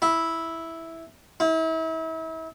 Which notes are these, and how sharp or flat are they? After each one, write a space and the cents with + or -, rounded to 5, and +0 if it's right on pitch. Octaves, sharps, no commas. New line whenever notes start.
E4 -5
E4 -35